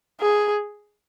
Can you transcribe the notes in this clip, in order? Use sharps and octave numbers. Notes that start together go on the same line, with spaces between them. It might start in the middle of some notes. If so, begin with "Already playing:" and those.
G#4